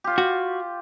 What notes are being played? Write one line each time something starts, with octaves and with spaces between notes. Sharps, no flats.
F4 G4
F#4